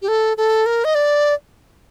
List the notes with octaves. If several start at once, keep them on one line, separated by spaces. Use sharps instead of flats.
G4
A4
A4
A#4
D#5
D5